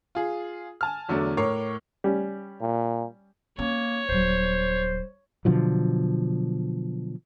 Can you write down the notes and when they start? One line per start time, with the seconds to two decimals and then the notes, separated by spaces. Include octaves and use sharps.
0.15 F4 G#4
0.81 G#5 A5 F6
1.09 E2 D3 F#3 A3 D4
1.37 A2 A#4 C#5 D6 C7
2.04 G3 C#4
2.61 A#2
3.59 A#3 C#4 C#5
4.09 D#1 F#3 C5
5.45 B2 D3 F3 F#3